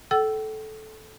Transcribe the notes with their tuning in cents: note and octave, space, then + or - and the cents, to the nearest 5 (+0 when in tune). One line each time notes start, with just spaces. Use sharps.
A4 -15 G5 -40 E6 +5